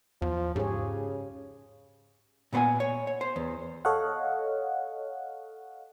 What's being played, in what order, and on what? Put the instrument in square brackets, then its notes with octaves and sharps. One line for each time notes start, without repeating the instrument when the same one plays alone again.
[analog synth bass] E2 [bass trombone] F3
[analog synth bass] G#2 [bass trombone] C#3 [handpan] G4 G#4 C#5
[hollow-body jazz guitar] A#2 B3 C5 F#5 G#5
C#5
C#5
C5
E2
[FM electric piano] A4 C#5 D#5 F5 F#5